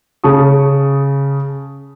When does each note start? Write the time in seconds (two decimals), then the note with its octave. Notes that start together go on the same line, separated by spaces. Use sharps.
0.24 C#3 A5 C#6 D#6